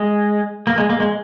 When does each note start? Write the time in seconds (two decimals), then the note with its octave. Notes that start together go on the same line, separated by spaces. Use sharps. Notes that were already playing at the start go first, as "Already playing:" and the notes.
Already playing: G#3
0.67 A#3
0.78 G#3
0.90 A#3
1.00 G#3